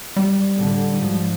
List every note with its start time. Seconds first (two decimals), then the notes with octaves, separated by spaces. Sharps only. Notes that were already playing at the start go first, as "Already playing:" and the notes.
0.16 G3
0.56 A2 D3
0.97 G#2 F3 F#3